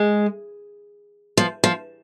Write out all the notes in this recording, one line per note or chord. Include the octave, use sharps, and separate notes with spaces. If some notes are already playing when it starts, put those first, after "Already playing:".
Already playing: G#3
F3
F3